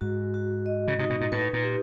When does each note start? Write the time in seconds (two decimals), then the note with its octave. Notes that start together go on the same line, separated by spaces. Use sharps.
0.01 G#2 F#4
0.34 F#4
0.66 D#5
0.88 C#3
0.99 C3 D#4
1.10 B2
1.21 A#2
1.32 A2 B4
1.53 A#2
1.63 G4